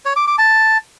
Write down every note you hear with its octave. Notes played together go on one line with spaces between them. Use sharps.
C#5
D6
D6
A5